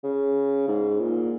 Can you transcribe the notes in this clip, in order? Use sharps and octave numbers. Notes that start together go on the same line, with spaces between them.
C#3
G#2
A#2